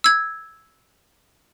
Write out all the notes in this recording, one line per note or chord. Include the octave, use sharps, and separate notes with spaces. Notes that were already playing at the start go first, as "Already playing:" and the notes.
E6 G#6